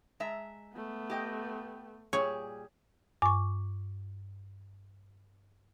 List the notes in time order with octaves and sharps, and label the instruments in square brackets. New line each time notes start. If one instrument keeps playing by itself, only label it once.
[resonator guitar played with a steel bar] G#3 E5 A#5
[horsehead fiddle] A3 B3
[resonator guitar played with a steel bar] G4 D#5 G5
[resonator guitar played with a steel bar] A#2 G3 G#4 [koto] C#5
[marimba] G2 [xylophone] C#6 D6